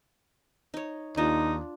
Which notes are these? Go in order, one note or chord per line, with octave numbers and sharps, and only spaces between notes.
D#4 C#5
D#2 D4 D#4 F4